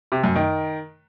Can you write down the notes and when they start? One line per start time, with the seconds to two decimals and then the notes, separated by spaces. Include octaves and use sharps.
0.12 C3
0.24 F#2
0.35 D#3